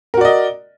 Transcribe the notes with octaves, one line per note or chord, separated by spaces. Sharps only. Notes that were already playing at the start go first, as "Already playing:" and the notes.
F#4 A#4 D5 D#5